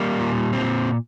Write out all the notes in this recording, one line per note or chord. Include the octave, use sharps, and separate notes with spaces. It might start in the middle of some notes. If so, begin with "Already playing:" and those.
Already playing: G3 A#3
A#2
C4